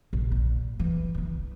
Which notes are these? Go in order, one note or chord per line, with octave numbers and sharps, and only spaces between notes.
A#1
A#2
E3
E3 E4